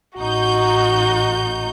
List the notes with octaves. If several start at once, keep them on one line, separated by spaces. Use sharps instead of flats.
A1 D#4 F#4 G6